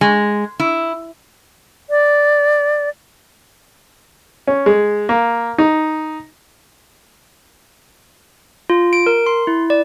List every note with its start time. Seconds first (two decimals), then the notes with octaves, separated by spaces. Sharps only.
0.01 G#3
0.60 E4
1.90 D5
4.47 C#4
4.66 G#3
5.09 A#3
5.58 D#4
8.70 F4
8.93 D7
9.06 A#4
9.26 C6
9.47 E4
9.70 D5